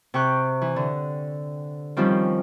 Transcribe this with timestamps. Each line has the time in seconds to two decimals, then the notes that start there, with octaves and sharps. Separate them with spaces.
0.14 C3 G5 C#6 F#6
0.61 E3
0.76 D3
1.97 D#3 F3 G3 C4 C#4 F4